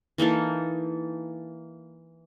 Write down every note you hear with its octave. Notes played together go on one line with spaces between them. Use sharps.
E3 A#3 D#4 A4